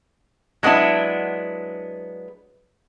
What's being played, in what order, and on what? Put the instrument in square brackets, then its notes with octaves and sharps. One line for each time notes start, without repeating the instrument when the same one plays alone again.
[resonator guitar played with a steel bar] F#3 G#3 B3 D4 E4